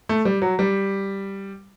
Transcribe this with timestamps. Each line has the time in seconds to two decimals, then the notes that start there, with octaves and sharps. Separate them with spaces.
0.09 A3
0.25 G3
0.42 F#3
0.59 G3